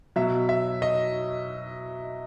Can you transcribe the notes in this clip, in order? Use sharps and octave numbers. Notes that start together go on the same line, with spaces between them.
B2 F#3 E5
E5
D#5